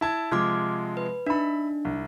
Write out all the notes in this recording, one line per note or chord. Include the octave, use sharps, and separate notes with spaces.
E4 A5 G#6
C3 F3 G#3 D6 F6 G#6
B4
D4 D#4 E5 B5
C2